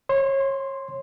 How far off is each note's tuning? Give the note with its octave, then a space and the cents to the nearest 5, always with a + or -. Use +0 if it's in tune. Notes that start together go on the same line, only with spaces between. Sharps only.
C#5 -30 C6 +0